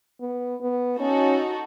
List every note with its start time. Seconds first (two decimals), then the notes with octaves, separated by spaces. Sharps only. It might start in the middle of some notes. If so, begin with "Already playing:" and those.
0.20 B3
0.61 B3
1.00 C#4 D#4 F#4 A4